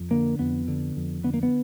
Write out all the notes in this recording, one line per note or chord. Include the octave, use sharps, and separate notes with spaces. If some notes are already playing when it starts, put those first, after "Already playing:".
Already playing: F2
D3 A#3
F2 B3
D3
F2
D3 B3
A#3
B3